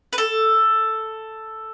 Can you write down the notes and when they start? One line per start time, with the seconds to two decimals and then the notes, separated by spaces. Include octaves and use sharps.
0.13 B4
0.18 A4